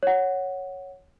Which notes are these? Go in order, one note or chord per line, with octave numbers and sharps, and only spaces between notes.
C#5 F#5